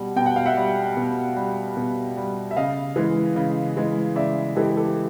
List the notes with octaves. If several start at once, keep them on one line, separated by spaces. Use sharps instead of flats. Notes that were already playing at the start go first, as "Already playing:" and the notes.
Already playing: B2 G3 F#5
B2 G5
F#5
F5
E5 F#5
G3
B2
G3
B2
G3
E5
C#3 D#5 F5
E3 G#3
C#3
E3 G#3
C#3 D5 E5
E3 G#3 G4 A4
G4 A4